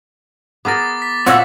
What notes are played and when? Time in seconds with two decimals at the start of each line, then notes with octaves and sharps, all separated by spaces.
0.65 B3 G#4 A#4 D6 A6
1.02 B6
1.26 A#2 C4 C#5 E5 F#5 E6